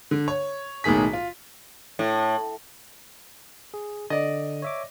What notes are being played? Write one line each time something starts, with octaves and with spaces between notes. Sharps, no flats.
D3
C#5
B1 A2 D#3 G#4 B6
F4
A2
G#4
D3 D5 D#5
C#5 E5 D6